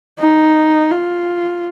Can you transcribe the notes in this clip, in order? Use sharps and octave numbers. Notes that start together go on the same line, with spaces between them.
D#4
F4